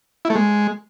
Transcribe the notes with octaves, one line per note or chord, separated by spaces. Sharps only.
E4
A3
G#3